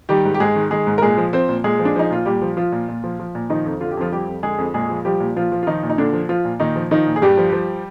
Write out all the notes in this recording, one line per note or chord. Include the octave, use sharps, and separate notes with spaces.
D#3 G3 G4
G#2
G4
G#2 G#3 G#4
D#3
D#3 G#3 G#4
G#2
A#4
A#2 G#3 G#4
F3
F3 C4 C5
A#2
A#2 G#3 G#4
F3
D4
F3 D#4
A#2 F4
A#2 G3 G4
F3
F3 F4
A#2
A#2
F3
F3
A#2
D#3 F3 D#4
F2
D3 F4
G4
F2 F3 F4
F3 G3 G4
F2
D3 G#3 G#4
F2
A#2 G#3 G#4
F3
F3 G3 G4
A#2
A#2 F3 F4
F3
F4
D#3 F3 D#4
A#2
D#4
A#2 D3 D4
F3
F3 F4
A#2
A#2 D#3 D#4
F3
D#3 F3 D#4
A#2
G#4
G2 G3 G4
F3
F3